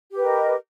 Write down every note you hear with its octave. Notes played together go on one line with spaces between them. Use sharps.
G4 A#4 B4 D#5